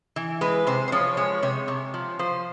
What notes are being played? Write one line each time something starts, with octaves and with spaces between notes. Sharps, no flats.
E3
G#3 B4
C3 C5
C5
F3 C#5
G#3 C#5
C3 C#5
C3
F3
F3 C5